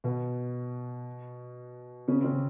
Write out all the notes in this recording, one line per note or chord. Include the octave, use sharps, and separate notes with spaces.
B2 B3
C#3 C#4
C4
C#3 C#4